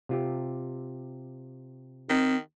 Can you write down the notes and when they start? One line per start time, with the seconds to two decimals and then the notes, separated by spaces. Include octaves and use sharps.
0.09 C3 F4 G4
2.10 D#3 C4